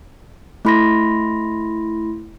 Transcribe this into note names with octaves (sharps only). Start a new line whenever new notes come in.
A3 E4 B5 C6 A#6